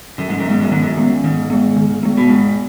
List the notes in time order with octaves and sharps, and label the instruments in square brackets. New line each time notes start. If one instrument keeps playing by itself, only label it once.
[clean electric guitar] F#2 [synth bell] D#3
[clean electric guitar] G#2
F#2
[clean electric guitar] G#2 [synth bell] G#3 B3
[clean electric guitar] F#2
[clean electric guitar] G#2 [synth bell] D#3
[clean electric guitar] F#2
[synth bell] G#3 B3
[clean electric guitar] G#2 [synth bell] D#3
[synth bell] G#3 B3
D#3
G#3 B3
[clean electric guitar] B2
[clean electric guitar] G#2 [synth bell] G#3